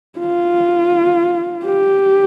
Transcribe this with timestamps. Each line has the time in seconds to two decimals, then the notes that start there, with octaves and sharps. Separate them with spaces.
0.19 F4
1.65 G4